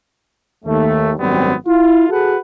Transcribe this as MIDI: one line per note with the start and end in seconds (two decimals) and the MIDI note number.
0.65 1.12 39
0.65 1.12 57
1.19 1.54 32
1.19 1.54 42
1.19 1.54 55
1.19 1.54 59
1.19 1.54 60
1.67 2.08 64
1.67 2.08 65
2.09 2.36 66
2.09 2.36 68
2.09 2.36 69
2.09 2.36 71
2.09 2.36 78